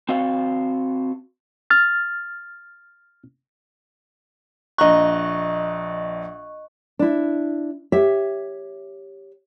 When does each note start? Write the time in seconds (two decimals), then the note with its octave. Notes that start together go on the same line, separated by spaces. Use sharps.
0.09 C4 F#4 F5
1.70 F6 A6
4.78 A#1 D#5 A#5 C#6 F#6
6.99 D4 E4
7.92 G4 C#5 E5